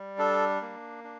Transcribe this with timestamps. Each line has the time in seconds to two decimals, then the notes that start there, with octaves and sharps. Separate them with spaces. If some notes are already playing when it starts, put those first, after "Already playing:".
Already playing: G3
0.18 D4 A4
0.61 A#3
1.04 D4